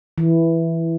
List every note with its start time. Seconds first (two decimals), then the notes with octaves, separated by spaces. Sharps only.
0.18 E3